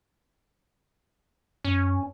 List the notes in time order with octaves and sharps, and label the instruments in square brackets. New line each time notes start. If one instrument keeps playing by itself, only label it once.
[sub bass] F#2 [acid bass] C#4